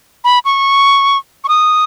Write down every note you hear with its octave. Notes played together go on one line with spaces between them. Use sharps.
B5
C#6
C#6
D#6